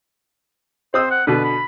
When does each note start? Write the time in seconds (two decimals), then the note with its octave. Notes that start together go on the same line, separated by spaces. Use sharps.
0.94 C4 C5 D#6 E6
1.11 F#5
1.27 B2 D3 B4
1.44 B5